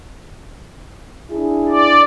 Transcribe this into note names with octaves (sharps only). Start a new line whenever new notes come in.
D4 E4 G#4
D5